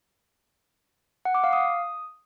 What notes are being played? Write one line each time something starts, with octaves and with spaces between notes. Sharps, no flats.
F#5
D6
F5
D#6